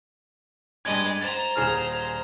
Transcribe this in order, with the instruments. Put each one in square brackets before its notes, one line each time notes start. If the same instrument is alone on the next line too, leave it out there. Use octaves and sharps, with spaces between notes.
[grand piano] G2 G#6 [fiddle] G#3 D#5
[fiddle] C5 A#5 [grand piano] A6
[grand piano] D#1 G#4 F6